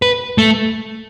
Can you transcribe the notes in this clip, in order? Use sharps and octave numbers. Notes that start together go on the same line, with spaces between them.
B4
A3